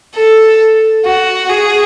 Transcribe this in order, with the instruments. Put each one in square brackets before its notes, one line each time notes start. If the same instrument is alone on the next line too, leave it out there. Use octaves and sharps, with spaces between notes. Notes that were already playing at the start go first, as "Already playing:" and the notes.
[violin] A4
F#4
G#4